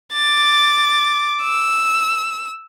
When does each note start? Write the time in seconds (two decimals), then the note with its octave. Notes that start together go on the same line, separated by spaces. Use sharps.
0.14 D6 A6
1.43 E6